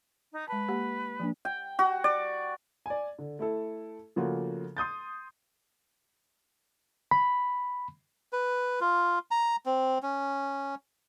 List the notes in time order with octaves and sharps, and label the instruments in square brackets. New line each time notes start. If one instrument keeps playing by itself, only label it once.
[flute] D#4
[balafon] G#3 A5 [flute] B4
[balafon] A#3 G4 F#5
F3 A#3 D4
[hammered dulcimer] G5
F#4
D5
[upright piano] D5 G#5
D3
A3 E4 A4
C#3 F3 A3 A#3 F4 F#4
C6 D#6 G6 A6
[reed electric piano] B5
[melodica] B4
F4
A#5
C4
C#4